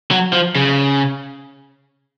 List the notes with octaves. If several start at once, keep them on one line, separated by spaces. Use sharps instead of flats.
F#3
F3
C#3